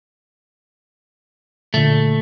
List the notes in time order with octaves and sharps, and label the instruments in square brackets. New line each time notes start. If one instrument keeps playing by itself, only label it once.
[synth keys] A#2 D3 [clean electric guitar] A3